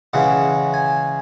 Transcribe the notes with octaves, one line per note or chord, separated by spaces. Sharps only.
C#3 E3 G#3 C#4 F#5
G#5